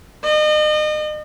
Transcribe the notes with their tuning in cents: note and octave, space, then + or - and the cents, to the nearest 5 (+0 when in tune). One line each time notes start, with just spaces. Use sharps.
D#5 -35